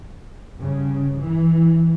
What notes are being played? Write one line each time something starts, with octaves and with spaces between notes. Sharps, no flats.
G2 C#3
E3